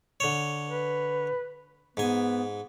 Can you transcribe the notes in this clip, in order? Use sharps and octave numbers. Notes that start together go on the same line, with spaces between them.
D3 C#5
B4
G#2 B3 G#5